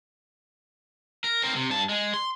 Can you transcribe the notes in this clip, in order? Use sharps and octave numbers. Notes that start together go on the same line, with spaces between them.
A#4
C4 A#4
C3
G2 A5
G#3
C6